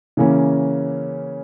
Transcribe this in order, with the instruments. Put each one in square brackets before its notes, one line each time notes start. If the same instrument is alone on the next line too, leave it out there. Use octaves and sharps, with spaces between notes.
[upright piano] C#3 E3 A#3 C#4